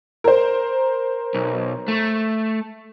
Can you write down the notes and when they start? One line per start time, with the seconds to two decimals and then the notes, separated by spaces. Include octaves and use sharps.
0.24 A#4 C5
1.34 B1
1.88 A3